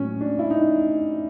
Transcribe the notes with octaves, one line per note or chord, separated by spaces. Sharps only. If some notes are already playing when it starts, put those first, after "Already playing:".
Already playing: A2 F#3 A#3 C#4
D4
E4
D#4